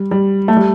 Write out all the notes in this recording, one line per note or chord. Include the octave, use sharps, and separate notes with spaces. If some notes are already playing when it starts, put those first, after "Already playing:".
Already playing: G3
G3
A3
G3